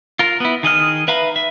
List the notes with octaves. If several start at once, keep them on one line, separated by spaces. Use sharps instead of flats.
F4 A#4
B3 E4
D#3 G#4 D#5 F6
B4 E5 F5 A#5 B5
E5